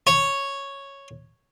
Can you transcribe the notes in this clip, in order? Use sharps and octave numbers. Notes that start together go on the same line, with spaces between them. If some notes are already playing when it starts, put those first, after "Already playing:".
C#5